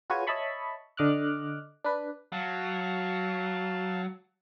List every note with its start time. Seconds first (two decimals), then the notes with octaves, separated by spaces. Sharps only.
0.10 F4 F#4 G#4 B4 C#5 G#5
0.27 C#5 D#5 E5 A5 B5 C#6
0.97 D3 D#5 D6 F6 F#6
1.85 D4 B4
2.32 F#3 F5 A5